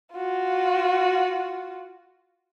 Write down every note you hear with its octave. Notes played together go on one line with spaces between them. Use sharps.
F4 F#4